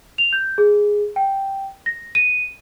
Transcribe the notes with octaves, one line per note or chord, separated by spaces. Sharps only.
F7
G6
G#4
G5
A#6
D#7